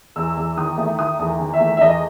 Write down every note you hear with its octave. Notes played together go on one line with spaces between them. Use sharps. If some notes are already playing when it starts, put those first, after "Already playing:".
E2 E6
E2
D#3 D#6
A3
D#3 D#6
E2
D#3
E5
A3
E5
E2 D#5